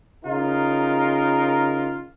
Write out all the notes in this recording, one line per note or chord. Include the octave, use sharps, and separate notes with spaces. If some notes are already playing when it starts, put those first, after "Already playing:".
C#3 D#4 F4 A#4